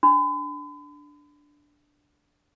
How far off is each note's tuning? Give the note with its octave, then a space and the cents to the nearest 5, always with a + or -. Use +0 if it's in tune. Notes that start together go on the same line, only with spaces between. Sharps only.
D4 +0 B5 +45